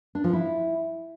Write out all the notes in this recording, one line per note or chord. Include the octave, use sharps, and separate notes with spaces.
D4
F3
E4